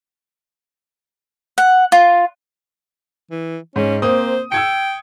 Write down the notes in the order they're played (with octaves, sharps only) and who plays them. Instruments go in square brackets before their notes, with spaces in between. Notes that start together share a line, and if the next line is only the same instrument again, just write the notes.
[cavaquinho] F#5
F4
[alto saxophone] E3
[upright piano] G#2 [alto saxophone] C#4
[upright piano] A#3 C4 D#6 [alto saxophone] C5
[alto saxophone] G5 [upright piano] E6 G#6 C#7